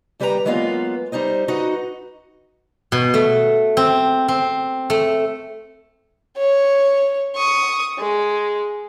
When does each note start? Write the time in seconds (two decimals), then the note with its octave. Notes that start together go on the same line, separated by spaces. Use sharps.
0.20 D#2 G3 G4 B4 C#5 A#5
0.45 F#3 G#3 A#3 B3 F4 F5
1.12 G3 D#4 C5 D#5
1.48 D#4 F#4 B4 D#5
2.92 B2
3.14 A3
3.77 C4
4.28 C4
4.90 A3
6.37 C#5
7.35 C#6 D#6
7.99 G#3